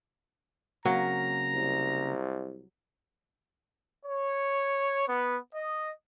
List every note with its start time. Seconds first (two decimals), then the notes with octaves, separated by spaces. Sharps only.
0.86 C#3 F#3 A#3 C4 A#5
1.53 C2
4.03 C#5
5.07 B3
5.54 D#5